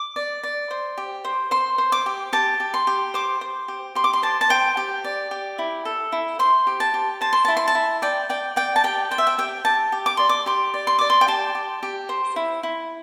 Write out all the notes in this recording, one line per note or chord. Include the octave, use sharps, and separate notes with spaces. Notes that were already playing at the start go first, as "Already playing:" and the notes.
Already playing: D6
D5
D5
C5
G4
C5
C5 C6
C5
D6
G4
G4 A5
G4
C6
G4
C5 D6
C5
G4
G4 C6
D6
C6
C5 A5
A5
C5 G5
G4
D5
G4
E4
A4
E4
C5 C6
G4
A5
G4
C5 A5
C6
E4 A5
C6
A5
E4
D5 G5
D5 G5
D5 G5
A5
G4 G5
C5 G5
E5
G5
G4 G5
G4 A5
G4
D6
D5 C6
D6
G4 C6
D5
C6
D5 D6
C6
G5
G4 A5
G4
G4
C5
E4
E4